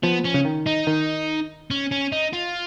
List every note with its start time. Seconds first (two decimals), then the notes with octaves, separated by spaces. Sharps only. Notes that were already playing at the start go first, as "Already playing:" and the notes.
0.03 F3 B3
0.25 C#4
0.34 C#3
0.45 D#3
0.66 D#4
0.87 D#3
1.70 C#4
1.91 C#4
2.12 D#4
2.33 F4